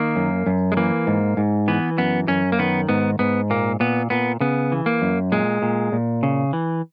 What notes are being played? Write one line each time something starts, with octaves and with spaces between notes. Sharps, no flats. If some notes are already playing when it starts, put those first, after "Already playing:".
Already playing: D#3 A#3
F#2
F#2
G#3
E3 A#3
G#2
G#2
E3 B3
F#2 B3
F#2 C#4
A#3
D#3 B3
G#2 B3
G#2 B3
A#2 A#3
A#2 B3
A#2 B3
C#3 B3
E3
A#3
F#2
A#2 G#3
A#2
A#2
C#3
E3